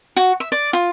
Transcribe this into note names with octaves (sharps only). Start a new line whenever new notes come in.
F#4
E5
D5
F4